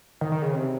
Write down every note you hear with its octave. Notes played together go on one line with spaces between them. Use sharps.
D#3
D#3
C#3
C3